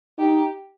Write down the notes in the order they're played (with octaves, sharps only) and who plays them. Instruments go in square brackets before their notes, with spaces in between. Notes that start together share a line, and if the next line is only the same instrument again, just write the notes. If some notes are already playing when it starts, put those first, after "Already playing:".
[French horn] D#4 [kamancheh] G4